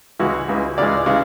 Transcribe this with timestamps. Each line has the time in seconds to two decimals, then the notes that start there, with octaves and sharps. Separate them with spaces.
0.20 C#2 C#3 E3 G#3 F#4
0.48 C#2 C#3 E3 G#3
0.78 C#2 C#3 E3 G#3 D5
1.06 C#3 E3 G#3